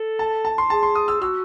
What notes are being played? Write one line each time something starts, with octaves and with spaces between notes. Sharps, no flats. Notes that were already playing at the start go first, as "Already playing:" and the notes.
Already playing: A4
A5
A5
C6
G#4 A5
C6
D#6
E6
F#4 E6